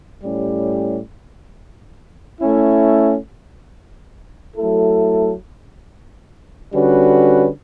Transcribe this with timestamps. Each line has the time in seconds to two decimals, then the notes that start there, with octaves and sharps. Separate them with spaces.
0.24 A2 G3 C#4 G4
2.40 A3 C#4 E4
4.57 F#3 A3 E4 A4
6.73 D3 G3 C#4 F#4 B4